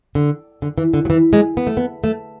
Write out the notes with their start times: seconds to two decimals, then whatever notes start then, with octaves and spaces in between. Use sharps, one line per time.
0.15 D3
0.62 D3
0.78 E3
0.94 D3
1.05 F#3
1.10 E3
1.33 G#3
1.57 B3
1.67 A3
1.77 B3
2.04 A3